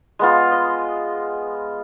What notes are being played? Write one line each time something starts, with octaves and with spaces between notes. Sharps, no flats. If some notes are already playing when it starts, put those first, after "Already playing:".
G#3 B3 F4
D#5